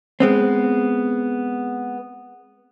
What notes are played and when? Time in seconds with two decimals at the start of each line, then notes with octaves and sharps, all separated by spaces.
0.20 G#3 B3 C4